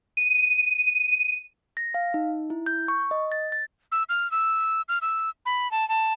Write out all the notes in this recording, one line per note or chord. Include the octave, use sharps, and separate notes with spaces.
D#7
A#6
F5
D#4
E4
G6
C#6
D#5
A6
A6
E6
F6
E6
F6
E6
B5
A5
A5